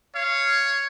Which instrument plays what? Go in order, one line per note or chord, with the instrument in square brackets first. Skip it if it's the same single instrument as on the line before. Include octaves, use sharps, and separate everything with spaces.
[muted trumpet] C#5 [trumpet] F5